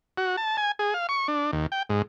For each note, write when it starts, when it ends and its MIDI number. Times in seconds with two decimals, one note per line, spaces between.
0.18 0.36 66
0.37 0.57 81
0.57 0.72 80
0.79 0.94 68
0.94 1.07 77
1.09 1.28 85
1.28 1.51 62
1.53 1.67 39
1.72 1.83 79
1.90 2.02 44